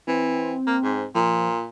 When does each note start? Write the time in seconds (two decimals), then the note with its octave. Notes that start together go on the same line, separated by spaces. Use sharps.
0.08 E3 C4
0.67 A#3
0.83 G#2
1.15 A#2 F3